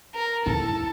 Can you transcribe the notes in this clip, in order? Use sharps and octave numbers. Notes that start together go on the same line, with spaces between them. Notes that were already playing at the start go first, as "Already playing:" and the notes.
A#4
E4 A4